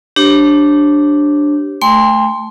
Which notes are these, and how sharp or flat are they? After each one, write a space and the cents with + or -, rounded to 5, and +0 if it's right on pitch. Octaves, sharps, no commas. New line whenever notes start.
D4 +0 G4 -10 C#5 -45
A3 -10 G5 +35 C6 +0